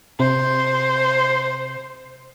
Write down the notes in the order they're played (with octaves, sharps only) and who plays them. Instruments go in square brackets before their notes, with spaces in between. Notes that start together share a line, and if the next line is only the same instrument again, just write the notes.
[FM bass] C3 [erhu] C5